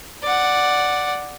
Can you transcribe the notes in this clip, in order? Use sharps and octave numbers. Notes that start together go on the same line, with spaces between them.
D5 F#5